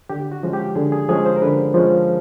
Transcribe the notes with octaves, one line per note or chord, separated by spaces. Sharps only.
D3 G4
F#4
F3 G#3 C#4
G4
D3 G#4
G#4
F3 G#3 C#4 G#4
C5
A#4
D3 B4
F3 G#3 C#4